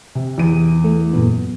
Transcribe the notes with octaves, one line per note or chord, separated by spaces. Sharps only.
C3
E2 D#7
A3
F#2 A#2 B3